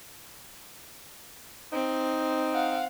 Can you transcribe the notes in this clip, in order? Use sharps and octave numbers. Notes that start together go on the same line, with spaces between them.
C4 D#4
F5 F#5